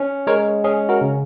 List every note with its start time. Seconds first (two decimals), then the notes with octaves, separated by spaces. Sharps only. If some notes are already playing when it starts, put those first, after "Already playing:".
Already playing: C#4
0.27 G#3 A#4 C#5
0.64 C#4 G#4
0.89 F#4 A#4
1.01 C#3